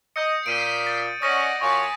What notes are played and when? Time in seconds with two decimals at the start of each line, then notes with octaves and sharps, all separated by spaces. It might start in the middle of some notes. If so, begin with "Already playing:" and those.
0.16 D#5 D#6 G6 C#7
0.46 A#2 G6 B6 C7 D7 D#7
0.87 A6
1.22 C#4 D5 D#5 F#5 D#6 A#6 D#7
1.61 F#2 F4 C#5 G#5 A5 B5